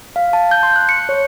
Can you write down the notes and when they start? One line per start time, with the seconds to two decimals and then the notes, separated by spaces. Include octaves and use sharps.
0.16 F5
0.33 A5
0.51 G6
0.63 C6
0.76 F#6
0.89 C#7
1.09 C#5